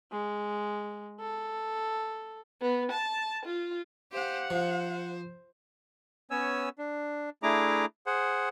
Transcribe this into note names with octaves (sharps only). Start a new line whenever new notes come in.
G#3
A4
B3
A5
F4
G4 C5 F5 F#5
F3 C5
B3 C#4 C#5 G#5 E6
D4
A3 D4 E4 G#4 A#5 D6
G#4 C5 F#5